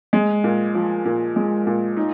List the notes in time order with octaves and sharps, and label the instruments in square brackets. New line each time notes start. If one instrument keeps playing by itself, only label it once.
[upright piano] G#3
A#2
F3
A#2
G#3
A#2
D#4